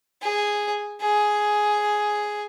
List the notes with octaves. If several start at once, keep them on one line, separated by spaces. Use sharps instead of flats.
G#4
G#4